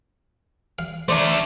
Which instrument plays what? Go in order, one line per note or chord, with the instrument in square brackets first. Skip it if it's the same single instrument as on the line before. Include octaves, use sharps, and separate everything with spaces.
[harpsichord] F5
[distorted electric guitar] A3 D4 [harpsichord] C5 D5 A#5